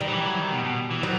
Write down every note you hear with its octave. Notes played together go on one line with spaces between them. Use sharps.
D#3 G3
F#3
E3
F#3
D#3
B2
B2
E3
D#3 F#3